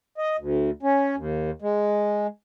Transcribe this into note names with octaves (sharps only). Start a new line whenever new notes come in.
D#5
D2
C#4
D#2
G#3